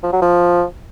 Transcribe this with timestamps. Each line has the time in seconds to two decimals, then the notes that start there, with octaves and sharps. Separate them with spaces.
0.03 F3
0.12 F#3
0.22 F3